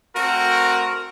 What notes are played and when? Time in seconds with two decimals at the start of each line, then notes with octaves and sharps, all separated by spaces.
0.15 A3 C4 F#4 A#4